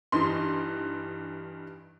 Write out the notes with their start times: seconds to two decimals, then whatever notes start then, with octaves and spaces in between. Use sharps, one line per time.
0.12 G2 E3 D#4 C6